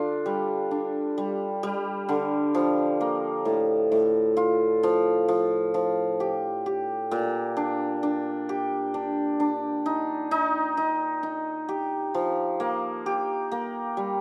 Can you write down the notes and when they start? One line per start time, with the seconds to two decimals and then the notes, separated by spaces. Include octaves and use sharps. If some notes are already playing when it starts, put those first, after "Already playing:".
Already playing: D3 D4 F4
0.26 G3
0.71 D4
1.18 G3
1.63 G3
2.09 D3
2.55 F3
3.01 A#3
3.45 A2
3.92 A2
4.37 F4
4.83 F3
5.28 F3
5.74 F3
6.20 G4
6.66 G4
7.11 A#2
7.57 D4
8.03 D4
8.49 G4
8.94 D4
9.40 D4
9.86 D#4
10.31 D#4
10.77 D#4
11.23 D#4
11.69 G4
12.14 F3
12.60 A#3
13.06 G4
13.52 A#3
13.97 G3